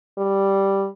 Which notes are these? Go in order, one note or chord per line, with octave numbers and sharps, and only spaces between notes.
G3